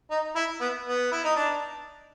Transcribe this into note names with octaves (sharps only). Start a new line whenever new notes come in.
D#4
E4
B3
B3
E4
D#4
D4